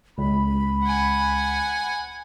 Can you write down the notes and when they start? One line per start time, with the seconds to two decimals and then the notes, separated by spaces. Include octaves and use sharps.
0.18 C#2 B5
0.84 F#5 G#5